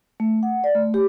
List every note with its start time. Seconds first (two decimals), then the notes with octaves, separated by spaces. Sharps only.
0.20 A3
0.43 F#5
0.64 D5
0.75 A3
0.94 G4